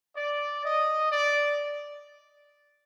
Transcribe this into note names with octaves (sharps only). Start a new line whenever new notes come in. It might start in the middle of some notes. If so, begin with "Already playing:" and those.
D5
D#5
D5